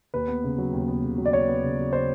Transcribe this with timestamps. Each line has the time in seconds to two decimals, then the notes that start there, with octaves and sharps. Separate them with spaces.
0.14 D#2 B4
0.28 B3
0.44 C#3
0.58 F#3
0.73 D#2
0.88 B3
1.03 C#3
1.18 F#3
1.26 D5
1.33 D#2 C#5
1.48 B3
1.63 C#3
1.78 F#3
1.93 C5